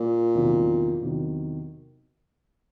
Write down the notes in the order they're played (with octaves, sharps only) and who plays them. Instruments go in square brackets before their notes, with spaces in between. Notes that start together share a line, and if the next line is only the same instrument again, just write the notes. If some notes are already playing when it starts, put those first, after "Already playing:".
Already playing: [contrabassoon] A#2
[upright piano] E2 C3 D#3 F#3
E2 C3 D#3 F#3